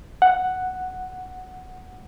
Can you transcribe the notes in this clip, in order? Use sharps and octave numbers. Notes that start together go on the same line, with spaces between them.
F#5